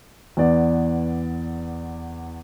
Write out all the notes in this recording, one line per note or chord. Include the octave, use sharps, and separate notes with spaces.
E2 B3 D5